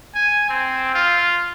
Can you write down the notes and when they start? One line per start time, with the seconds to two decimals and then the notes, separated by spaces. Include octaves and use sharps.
0.15 G#5
0.49 C4
0.94 F4